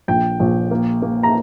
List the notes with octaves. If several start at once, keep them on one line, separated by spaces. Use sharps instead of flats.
A#1 G5
A#1
A#3
A#3
A#5